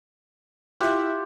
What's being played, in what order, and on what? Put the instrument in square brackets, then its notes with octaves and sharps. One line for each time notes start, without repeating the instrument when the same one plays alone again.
[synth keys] E4 E5 [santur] F4 G4 F#5